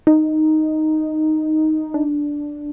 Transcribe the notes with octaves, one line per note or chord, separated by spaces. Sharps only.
D#4
D4